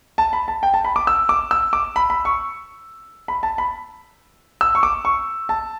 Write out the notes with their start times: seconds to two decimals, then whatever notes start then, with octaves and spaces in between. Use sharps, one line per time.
0.18 A5
0.33 B5
0.48 A5
0.63 G5
0.74 A5
0.85 B5
0.96 D6
1.07 E6
1.29 D6
1.51 E6
1.73 D6
1.96 B5
2.10 B5
2.25 C#6
3.28 B5
3.43 A5
3.58 B5
4.61 E6
4.75 C#6
4.83 D6
5.05 C#6
5.49 A5